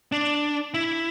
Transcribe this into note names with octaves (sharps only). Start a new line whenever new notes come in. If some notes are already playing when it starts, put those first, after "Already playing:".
D4
E4